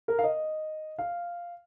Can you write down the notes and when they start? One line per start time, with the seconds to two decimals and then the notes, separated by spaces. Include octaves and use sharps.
0.08 A#4
0.19 F5
0.23 D#5
0.98 F5